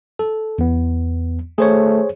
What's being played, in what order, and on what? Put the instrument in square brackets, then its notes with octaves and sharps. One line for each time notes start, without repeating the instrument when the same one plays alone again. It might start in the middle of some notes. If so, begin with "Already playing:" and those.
[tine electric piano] A4
E2 B3
[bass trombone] A3 [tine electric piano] G#4 C5 C#5